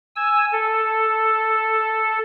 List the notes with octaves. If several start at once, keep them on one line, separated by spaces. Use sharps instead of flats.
G#5 E6
A4